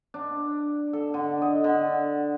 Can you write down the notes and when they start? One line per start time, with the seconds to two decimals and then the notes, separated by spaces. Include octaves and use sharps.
0.14 D4
0.93 A4
1.14 D3
1.42 D#5
1.64 D3